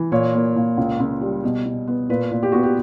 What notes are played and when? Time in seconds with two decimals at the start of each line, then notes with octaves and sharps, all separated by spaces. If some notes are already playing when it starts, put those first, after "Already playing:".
Already playing: E3
0.12 A#2 C#5
0.34 A#3
0.56 A#2
0.77 C#2
1.00 C#2
1.21 G3
1.44 B2
1.65 B2
1.87 B3
2.09 A#2 B4
2.31 A#2
2.43 G4
2.52 B3 F#4
2.63 G4